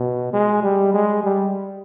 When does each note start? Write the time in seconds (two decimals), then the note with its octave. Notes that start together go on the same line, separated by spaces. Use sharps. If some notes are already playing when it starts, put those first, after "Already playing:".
Already playing: B2
0.33 G#3
0.63 G3
0.94 G#3
1.24 G3